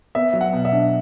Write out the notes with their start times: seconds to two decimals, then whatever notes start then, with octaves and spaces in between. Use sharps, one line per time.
0.15 B3 E5
0.33 F#3
0.41 F#5
0.53 B2
0.65 E5
0.72 D4